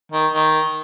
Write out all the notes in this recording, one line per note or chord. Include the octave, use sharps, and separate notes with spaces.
D#3
D#3